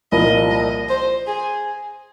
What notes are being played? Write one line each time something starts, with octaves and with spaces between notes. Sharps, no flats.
C2 A#2 F3 A#3 D#5
D#5
C5
G#4